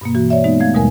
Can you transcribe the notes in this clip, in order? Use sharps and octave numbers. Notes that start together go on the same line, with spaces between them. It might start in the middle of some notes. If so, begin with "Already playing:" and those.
G2 B2 A#3
E3 F#4
C#5 D5 E5
G#3 B3 D#4
A3 F5 G#6
D#2 B2 G3 G#3 A#4 G#5